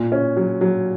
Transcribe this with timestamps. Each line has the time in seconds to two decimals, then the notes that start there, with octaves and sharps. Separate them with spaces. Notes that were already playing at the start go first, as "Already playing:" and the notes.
Already playing: A#2
0.12 C#4
0.37 F#3
0.61 F#3